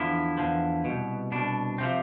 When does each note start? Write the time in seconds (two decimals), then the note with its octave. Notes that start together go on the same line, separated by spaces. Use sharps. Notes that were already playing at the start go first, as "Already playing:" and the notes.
Already playing: E2 D3 F3 E4
0.38 E2 D3 F3
0.85 C2 B2
1.32 C2 B2 D4
1.78 C3 F3 C4